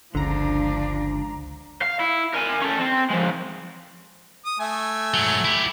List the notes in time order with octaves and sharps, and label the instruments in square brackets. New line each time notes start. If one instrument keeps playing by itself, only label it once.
[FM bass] G1 [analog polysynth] C#2 A#5 [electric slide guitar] D3 [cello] F3 D4
[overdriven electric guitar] F5
E4
A#4 G#5
C#4 A4
C4
F3 G#3
[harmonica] D#6
A3 E5 G#5
[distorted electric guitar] G#2 F#3
E4 G4